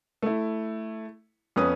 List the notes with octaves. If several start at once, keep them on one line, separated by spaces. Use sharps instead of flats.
A3 E4
F2 B3 C#4 B4 D#6